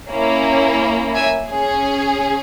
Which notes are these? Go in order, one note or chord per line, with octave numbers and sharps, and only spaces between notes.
A#3 C#4 E4
E5 G#5
C#4 G#4